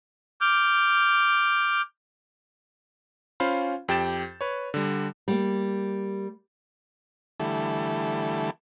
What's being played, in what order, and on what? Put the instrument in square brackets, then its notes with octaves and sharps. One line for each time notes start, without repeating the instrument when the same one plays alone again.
[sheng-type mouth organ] D6 F6 G6
[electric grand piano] C#4 F4 C5 F5 B5
F2 G4 G5 G6 A6 E7
B4 C#5
D3 G3
[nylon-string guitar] G3 A#3
[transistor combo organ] D3 E3 G3 A3 E4 A4